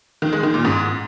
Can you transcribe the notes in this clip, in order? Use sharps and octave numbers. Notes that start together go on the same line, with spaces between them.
D#3
G#3
D#3
A#2
G#2